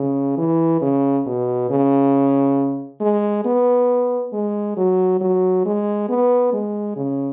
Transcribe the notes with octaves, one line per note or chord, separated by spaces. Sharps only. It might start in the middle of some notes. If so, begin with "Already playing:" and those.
Already playing: C#3
E3
C#3
B2
C#3
G#3
B3
G#3
F#3
F#3
G#3
B3
G#3
C#3